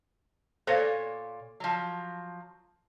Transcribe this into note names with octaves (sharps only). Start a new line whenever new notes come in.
A#2 A4 C5 C#5 F5
F3 F#3